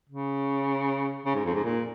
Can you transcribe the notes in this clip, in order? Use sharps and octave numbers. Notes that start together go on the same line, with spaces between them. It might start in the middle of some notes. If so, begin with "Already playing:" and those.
C#3
C#3
G#2
F2
G#2
A#2